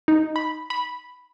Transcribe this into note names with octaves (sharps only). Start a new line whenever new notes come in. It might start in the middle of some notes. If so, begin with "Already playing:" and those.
D#4
B5
B5